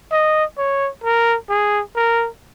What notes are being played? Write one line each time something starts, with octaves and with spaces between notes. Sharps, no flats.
D#5
C#5
A#4
G#4
A#4